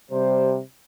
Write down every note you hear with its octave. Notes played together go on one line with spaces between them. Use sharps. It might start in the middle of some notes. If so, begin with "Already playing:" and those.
C3 G3 C5